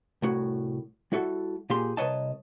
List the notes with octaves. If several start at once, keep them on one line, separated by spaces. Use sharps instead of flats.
C2 A2 F#4
G3 E4 F#4 A4
A#2 A#3 G4 G#4 C6
C2 G#2 B4 C#5 D#5 A5